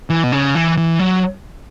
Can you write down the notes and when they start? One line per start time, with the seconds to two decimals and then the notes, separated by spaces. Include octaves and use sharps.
0.10 E3
0.23 B2
0.32 C#3
0.55 E3
0.77 E3
0.99 F#3